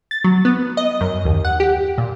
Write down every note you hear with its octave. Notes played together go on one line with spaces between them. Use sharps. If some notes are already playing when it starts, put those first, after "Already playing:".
A6
F#3
B3
D#5
F#2
D#2
F#5
G4
A#2